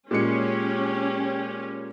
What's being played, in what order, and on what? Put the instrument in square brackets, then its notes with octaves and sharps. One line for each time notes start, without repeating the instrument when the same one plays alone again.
[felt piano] A#2 G#3 C#7 [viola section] C#4 [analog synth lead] G4